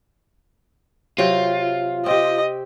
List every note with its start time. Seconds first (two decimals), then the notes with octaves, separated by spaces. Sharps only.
1.18 C3 F#3 F4 G5
2.06 C4 G4 D#5